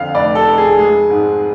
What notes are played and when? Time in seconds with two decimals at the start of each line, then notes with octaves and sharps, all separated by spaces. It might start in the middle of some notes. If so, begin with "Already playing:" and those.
Already playing: F2 D3 F5
0.15 F1 D5
0.35 A4
0.47 F1
0.58 G#4
0.78 G#3 G#4
1.10 G#2